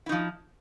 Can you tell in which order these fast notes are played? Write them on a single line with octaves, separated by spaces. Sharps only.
E4 D#4 F3